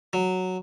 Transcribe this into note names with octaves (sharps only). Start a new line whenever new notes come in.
F#3